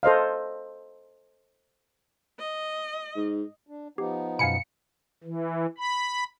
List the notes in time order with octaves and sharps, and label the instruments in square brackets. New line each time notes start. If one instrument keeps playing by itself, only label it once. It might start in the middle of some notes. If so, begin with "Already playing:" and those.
[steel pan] A4 C5 D#5 F5
[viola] D#5
[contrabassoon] G#2
[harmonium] D4
[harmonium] F3 B3 D#4 [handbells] G4
[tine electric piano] F#2 B2 [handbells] F5 G#5 B5 [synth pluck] C#7
[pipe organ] E3
B5